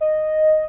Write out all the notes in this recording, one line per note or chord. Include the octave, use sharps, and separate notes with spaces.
D#5